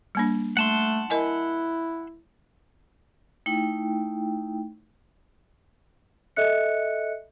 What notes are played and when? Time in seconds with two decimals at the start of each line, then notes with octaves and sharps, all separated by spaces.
0.15 G3 A#3 D4
0.57 A3 F#5 A5 C6
1.10 E4 A#4 D#5 G#5
3.46 A3 D#4 E4 G5
6.36 A4 D#5 E5 F#6 C#7